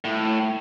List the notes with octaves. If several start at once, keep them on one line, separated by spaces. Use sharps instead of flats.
A2